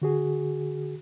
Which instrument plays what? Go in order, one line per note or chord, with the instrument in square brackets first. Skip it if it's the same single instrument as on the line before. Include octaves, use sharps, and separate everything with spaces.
[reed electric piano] D3 F#4 G#4